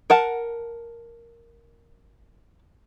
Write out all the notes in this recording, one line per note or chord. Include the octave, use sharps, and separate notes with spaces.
A#4 F#5 A5